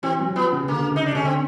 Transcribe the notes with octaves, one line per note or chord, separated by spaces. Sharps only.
E3 C4
F#3
F3 B3
C#3
D3 A#3
D3
C#3
D#4
D4
D3 C#4
C4